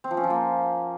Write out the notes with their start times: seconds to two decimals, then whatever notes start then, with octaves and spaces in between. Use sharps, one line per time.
0.04 C4
0.11 F3
0.17 C#4
0.24 F3
0.30 A#3